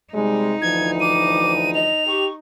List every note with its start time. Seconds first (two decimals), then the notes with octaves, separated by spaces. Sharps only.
0.14 C3 G3 G#3 D#4
0.62 D2 E3 F3 G#6
1.00 D6 D#7
1.74 D#5 F7
2.07 G4 C#6